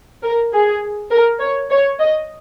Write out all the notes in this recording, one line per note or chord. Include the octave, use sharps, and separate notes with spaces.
A#4
G#4
A#4
C#5
C#5
D#5